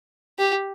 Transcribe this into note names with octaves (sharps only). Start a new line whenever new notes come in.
G4